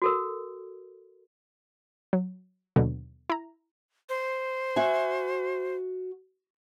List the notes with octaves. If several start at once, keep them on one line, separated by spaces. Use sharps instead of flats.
F#4 A4 A#4
F#3
D#2 B2 D3 F#3
E4 A#5
C5
F#4 E5 G#5